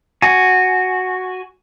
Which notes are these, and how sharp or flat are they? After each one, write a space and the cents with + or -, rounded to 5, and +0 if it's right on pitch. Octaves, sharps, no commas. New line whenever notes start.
F#4 +0 G#5 +0